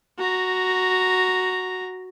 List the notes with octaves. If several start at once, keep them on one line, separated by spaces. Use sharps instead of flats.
F#4 A#5